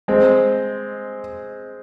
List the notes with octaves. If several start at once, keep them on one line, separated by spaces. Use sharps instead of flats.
G#3 C4